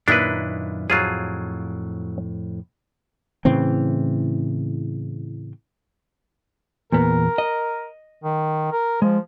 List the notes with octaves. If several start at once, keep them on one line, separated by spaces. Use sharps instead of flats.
F#2 A#2 D#3 D4 E4 B4
F2 A2 F#3 F4 G#4
A2 C#3 E3 C4
E2 A#2 B3 A#4
D#5
D#3
A#4
F3 G#3